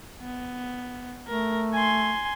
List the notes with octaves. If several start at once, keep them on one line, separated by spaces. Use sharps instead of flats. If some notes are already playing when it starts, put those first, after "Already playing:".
B3
A3 A#4
G#5 C6